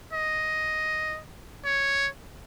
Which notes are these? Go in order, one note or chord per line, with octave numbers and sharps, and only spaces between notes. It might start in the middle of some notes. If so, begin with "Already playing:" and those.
D#5
C#5